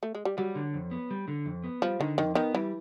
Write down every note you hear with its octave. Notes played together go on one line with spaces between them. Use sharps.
A3
G#3
G3
F#3 G3
D3
F2
B3
G3
D3
F2
B3
F3 G3
D3 D#3
F2 D#3
D#3 B3
E3 G3